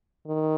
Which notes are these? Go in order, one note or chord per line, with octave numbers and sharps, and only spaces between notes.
D#3